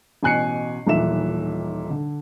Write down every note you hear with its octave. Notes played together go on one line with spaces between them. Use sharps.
A1 B2 G#5 F#6 C7 C#7
D#1 B1 A#2 E3 E5 E7
D3